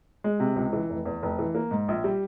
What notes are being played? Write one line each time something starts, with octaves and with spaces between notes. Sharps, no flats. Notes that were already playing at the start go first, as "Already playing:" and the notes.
G#3
C3
C#2
E3
F1
E2
F1
E3
A#3
G#2
A#1
G3